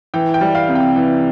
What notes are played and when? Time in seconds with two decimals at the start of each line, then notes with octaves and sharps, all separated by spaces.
0.14 E3 G5
0.34 G5
0.41 G3
0.55 F5
0.69 C3
0.75 G5
0.96 E3